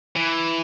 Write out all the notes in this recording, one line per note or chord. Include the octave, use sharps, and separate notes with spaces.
E3